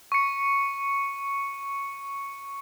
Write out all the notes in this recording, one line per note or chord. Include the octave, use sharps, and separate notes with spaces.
C#6 C#7